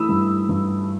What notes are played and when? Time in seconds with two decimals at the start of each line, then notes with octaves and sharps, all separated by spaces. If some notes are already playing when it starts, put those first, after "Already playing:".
Already playing: E3 A3 B5 D#6 E6
0.09 G2
0.49 G2